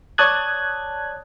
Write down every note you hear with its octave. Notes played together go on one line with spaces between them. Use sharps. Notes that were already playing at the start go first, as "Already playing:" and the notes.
C#5 D5 A5 D#6 F#6 G#6